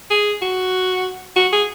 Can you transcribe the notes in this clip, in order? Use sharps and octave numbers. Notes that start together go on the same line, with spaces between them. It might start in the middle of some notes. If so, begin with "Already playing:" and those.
G#4
F#4
F#4
G#4